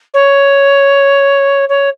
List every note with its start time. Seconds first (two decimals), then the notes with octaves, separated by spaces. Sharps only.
0.14 C#5
1.69 C#5